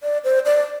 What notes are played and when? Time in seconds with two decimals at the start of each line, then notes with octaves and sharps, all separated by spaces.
0.03 D5
0.24 C5
0.46 D5